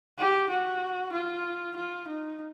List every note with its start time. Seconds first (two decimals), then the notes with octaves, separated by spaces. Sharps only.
0.19 G4
0.50 F#4
1.13 F4
1.76 F4
2.08 D#4